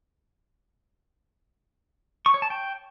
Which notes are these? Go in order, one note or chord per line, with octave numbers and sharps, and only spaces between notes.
C#6
C#5
A5
G5